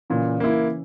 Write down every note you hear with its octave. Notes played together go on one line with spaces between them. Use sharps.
A#2 C#3 E3
A#3 E4